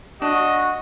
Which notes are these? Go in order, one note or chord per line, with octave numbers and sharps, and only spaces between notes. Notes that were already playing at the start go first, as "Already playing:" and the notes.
D4 F#4 D#5